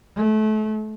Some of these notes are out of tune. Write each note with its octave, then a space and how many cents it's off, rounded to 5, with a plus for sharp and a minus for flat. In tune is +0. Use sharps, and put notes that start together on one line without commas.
A3 -30